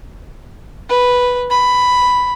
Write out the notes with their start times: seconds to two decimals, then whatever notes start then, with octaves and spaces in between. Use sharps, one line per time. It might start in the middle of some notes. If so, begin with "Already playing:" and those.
0.89 B4
1.50 B5